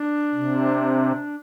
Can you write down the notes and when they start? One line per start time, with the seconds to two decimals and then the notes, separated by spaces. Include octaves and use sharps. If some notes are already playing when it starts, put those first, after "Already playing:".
Already playing: D4
0.34 C3